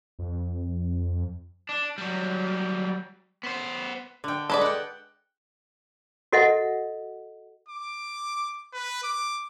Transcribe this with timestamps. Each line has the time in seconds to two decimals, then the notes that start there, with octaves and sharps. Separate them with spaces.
0.19 F2
1.69 D4
1.98 F#3 G3
3.44 B3 C5
4.24 D3 G5
4.50 G#3 A4 B4 D5
4.61 F#5 G5
6.33 F#4 A4 D#5 E5 F#5
7.69 D6
8.73 B4
9.04 D6